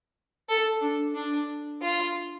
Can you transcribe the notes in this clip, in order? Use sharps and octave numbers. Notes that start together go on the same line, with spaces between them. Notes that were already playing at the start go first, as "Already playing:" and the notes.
A4
D4
D4
F4